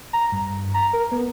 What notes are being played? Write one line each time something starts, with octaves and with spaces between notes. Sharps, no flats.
A#5
G2
A#5
A#4
B3